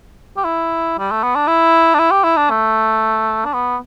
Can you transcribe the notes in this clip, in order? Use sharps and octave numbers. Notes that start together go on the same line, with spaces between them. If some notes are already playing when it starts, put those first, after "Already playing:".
G4
E4
G3
A3
B3
D4
E4
D4
E4
G4
E4
D4
A3
D4
B3